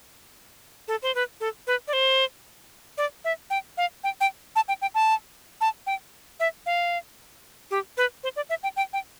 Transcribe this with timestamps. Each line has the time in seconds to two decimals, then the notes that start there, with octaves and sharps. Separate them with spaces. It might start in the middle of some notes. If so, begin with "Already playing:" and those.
0.88 A4
1.03 C5
1.15 B4
1.41 A4
1.67 B4
1.88 D5
1.93 C5
2.98 D5
3.25 E5
3.50 G5
3.77 F5
4.04 G5
4.21 G5
4.56 A5
4.68 G5
4.82 G5
4.95 A5
5.61 A5
5.87 G5
6.40 E5
6.66 F5
7.71 G4
7.97 B4
8.23 C5
8.36 D5
8.50 E5
8.63 G5
8.76 G5
8.93 G5